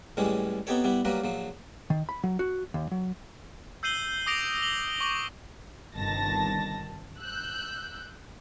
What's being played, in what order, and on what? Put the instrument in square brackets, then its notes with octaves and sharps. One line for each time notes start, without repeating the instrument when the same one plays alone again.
[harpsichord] A2 E3 G3 G#3 C#4
B3 C4 D#4 G4 A4 C#5
G3 B3 E4
F#3 G3 A#3 A#4 B4
A#1 F3 F#3
[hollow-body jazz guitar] D#3
B5
F#3
F#4
D#2
F#3
[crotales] E6 G6 C7 D#7 F#7 G7
D6 D#6 A#6 D7 F7
F#7 G7
C#6 D6 F#7
[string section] G1 C3 D#3 A5 A6 A#6
E6 F#6 G6